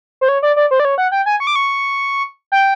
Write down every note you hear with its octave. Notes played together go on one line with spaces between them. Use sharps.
C5
C#5
D5
D5
C5
D5
C#5
F#5
G5
G#5
C#6
D6
C#6
G5